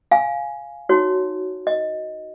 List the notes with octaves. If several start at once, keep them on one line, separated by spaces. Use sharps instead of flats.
F5 G#5
D#4 F#4 C#5
D#5